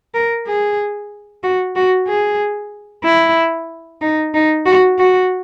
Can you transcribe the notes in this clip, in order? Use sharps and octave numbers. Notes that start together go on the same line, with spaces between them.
A#4
G#4
F#4
F#4
G#4
E4
D#4
D#4
F#4
F#4